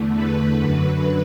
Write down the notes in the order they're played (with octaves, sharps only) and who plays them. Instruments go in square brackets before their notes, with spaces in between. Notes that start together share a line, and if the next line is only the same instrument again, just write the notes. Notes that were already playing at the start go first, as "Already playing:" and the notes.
Already playing: [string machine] E2 D3 A3
B4
F#2 D3 F#3